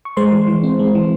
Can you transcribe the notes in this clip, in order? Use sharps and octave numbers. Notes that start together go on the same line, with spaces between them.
C#6
G#3 C5 C6
E3
E3
C4
G#3
E3